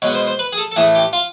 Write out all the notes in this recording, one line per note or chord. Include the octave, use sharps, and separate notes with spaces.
B2 G#3 B3 C#5
C5
C5
B4
G#4
A4
A4
A2 E3 A3 G#4
G4
F4